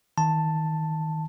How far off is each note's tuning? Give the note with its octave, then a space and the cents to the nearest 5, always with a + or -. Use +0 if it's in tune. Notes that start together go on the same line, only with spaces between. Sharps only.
D#3 +20 A5 +5